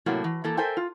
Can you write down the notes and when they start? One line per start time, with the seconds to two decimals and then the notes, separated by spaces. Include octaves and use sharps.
0.06 A2 C3 F#3 A#3
0.24 E3
0.44 E3 A#3 A4
0.57 A4 A#4 C5 E5 G5 G#5
0.77 F4